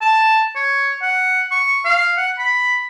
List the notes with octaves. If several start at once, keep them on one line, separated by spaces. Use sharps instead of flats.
A5
C#5
F#5
C#6
F5
F#5
B5